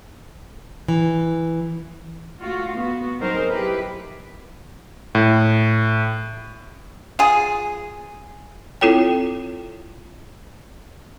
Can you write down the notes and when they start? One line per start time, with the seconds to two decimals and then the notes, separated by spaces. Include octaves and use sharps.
0.88 E3
2.40 A3 F4 F#4
2.75 B3 F#4
3.20 F#3 C4 D#4 G#4 A#4 C5
3.50 E4 G4 B4
5.15 A2
7.19 F4 G#4
8.81 C4 E4 F4 A4 C#5 G5